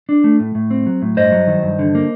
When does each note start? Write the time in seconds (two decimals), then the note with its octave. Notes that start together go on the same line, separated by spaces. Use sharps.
0.09 D4
0.24 A3
0.40 A2
0.55 A2
0.71 C4
0.86 F#3
1.02 A2
1.17 G2 C5 D#5
1.32 F#3
1.48 D#3
1.63 G2
1.79 D3
1.95 A#3